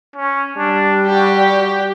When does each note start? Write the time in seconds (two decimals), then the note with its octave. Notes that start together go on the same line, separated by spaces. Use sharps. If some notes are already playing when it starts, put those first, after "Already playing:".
0.16 C#4
0.57 G3 D4
1.06 F#4 G4